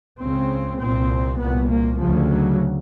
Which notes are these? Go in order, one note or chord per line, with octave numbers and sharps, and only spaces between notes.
C#2 C#3 C4
C2 A#2 C4
C2 A#2 B3
A#3
D2 C#3 F3
F#3